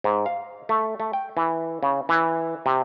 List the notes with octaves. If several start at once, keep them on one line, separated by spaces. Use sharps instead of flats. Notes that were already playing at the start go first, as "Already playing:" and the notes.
G#2
F5
A3
A3
G5
E3
C#3
E3
C3